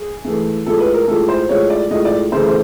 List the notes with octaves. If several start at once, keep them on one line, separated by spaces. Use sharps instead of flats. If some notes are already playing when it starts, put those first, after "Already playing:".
Already playing: G#4
G#2 E3 A3
A2 F3 G#3 A4
B4
A#4
A2 F3 G#3 A4
C5
A2 F3 G#3 C#5
D5
A2 F3 G#3 D#5
D5
D2 C#3 E3 A3 C5
C5